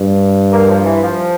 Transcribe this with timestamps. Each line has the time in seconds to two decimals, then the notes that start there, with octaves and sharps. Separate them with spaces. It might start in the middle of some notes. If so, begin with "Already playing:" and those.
Already playing: G2
0.52 A#3
0.69 F3
0.85 E3
1.03 F3